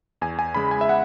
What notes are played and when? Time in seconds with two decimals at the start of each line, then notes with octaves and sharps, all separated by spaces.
0.21 E2 G#5
0.39 G#5
0.54 C#3 G#3 B5
0.71 G#5
0.81 E5
0.89 F#5